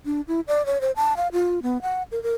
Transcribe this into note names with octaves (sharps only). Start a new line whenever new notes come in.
D4
E4
D5
C#5
C5
A5
F5
F4
B3
F#5
A#4
A#4